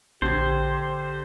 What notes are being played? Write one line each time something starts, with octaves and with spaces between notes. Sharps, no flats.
A#1 D3 G4 C5 G#6